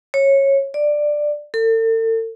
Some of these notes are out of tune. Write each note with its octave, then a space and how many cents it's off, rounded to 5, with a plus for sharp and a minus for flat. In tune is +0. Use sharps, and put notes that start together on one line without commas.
C#5 -15
D5 +10
A4 +40